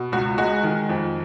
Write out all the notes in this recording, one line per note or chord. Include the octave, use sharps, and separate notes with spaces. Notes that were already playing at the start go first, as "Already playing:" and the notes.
Already playing: B2
C#2 F#4
G#3 F#4
D#3
F2